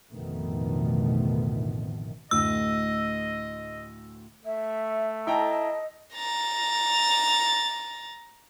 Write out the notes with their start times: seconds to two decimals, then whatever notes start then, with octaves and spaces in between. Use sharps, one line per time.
0.11 A1 F2 B2 D3 D#3 A3
2.31 D2 A2 D#5 E6
4.45 A3 E5
5.27 E4 A4 D#5 G5 A5 A#5
6.14 A#5 A6